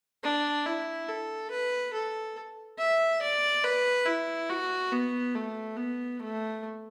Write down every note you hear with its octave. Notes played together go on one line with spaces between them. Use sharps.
D4
E4
A4
B4
A4
E5
D5
B4
E4
F#4
B3
A3
B3
A3